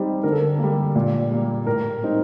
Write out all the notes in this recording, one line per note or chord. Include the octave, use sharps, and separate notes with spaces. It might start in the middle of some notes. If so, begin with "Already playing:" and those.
Already playing: G3 C4 D#4
D3 A#4
A4
A#4
G3 A#3
A#2
G3 A#3
A2 A#4
G3 C4 D#4